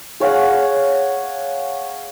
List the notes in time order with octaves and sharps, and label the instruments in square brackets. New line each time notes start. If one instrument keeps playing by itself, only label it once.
[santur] G#4 C#5 F5 F#5